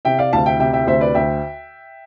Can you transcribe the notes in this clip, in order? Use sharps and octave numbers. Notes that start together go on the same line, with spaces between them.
C3 E5 G5
D5 F5
D2 F5 A5
E5 G5
C3 E5 G5
E5 G5
D2 C5 E5
B4 D5
D2 E5 G5